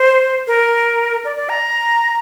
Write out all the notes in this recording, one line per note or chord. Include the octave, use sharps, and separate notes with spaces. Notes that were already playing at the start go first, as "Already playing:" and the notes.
Already playing: C5
A#4
D5
D5
A#5